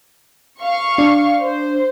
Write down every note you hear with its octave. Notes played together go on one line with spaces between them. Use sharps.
F5 C#6
D4
C5